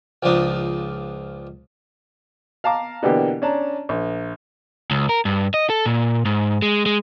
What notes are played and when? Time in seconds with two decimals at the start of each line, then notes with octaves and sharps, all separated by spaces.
0.23 C#2 F3 D4 D#4
2.64 F5 A5 A#5 D6
3.03 B2 D3 E3 A#3 D4 G4
3.42 C#4 D4 A5 A#5
3.89 A#1
4.91 C#2
5.09 A#4
5.25 G2
5.54 D#5
5.70 A4
5.86 A#2
6.25 G#2
6.62 G#3
6.86 G#3